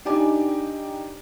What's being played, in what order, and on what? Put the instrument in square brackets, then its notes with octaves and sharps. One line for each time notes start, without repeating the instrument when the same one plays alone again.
[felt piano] D4 D#4 G4 D5 G#5 D6